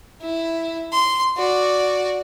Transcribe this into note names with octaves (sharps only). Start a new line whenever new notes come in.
E4
C6
F#4 D5